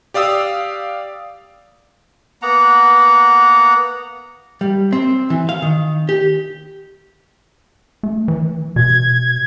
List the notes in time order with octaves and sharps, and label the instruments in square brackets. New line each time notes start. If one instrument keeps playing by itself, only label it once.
[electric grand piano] G4 D5 F5 D#6 E6
[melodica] A#3 B3 F#5 A#5
[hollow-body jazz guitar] G3
C4
E3
F5
D#3
G4
[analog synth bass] A3
E3
[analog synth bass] B2 [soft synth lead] G#6